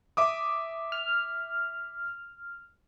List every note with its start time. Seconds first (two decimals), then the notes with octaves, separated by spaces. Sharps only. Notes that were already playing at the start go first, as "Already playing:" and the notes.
0.17 E5 D6 D#6
0.92 F6